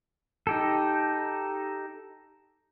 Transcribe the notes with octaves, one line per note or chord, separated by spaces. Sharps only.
D#4 G4 A4